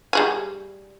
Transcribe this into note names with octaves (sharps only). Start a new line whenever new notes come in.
G3 G#4 G#5